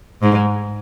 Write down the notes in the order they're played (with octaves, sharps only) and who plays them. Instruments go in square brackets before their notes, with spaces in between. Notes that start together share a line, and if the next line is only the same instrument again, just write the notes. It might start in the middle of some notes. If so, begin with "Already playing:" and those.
[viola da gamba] G#2